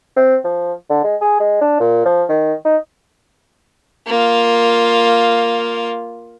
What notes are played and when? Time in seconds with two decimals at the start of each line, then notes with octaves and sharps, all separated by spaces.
0.16 C4
0.44 F3
0.90 D3
1.04 G#3
1.21 G#4
1.40 G#3
1.61 D4
1.80 A#2
2.06 F3
2.29 D#3
2.65 D#4
4.07 A#3 F4